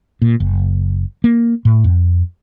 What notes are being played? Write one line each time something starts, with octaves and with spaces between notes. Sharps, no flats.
A#2
F#1
A#3
A2
F2